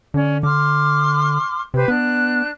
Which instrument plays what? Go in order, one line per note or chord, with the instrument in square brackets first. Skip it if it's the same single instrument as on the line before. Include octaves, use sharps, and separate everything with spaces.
[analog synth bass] D3 [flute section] C#4 D5
[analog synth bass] D3 [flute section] C6 D6 F6
[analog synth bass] C3 [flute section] G4 B4 C5
[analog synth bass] B3 [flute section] D4 F#6